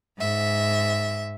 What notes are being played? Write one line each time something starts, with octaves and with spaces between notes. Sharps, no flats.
G#2 E5